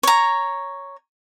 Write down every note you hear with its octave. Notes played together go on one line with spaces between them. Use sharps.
C#5 A#5